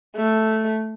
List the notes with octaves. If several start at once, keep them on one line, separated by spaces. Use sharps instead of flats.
A3